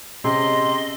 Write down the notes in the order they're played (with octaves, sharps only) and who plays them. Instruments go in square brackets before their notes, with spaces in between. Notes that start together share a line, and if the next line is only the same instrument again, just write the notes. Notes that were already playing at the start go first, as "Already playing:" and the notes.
[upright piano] C3 [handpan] C#4 G#4 [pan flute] D#5 [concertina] C6